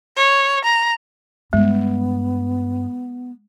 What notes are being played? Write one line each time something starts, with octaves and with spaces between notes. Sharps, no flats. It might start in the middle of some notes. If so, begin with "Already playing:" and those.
C#5
A#5
G2 G#3 B3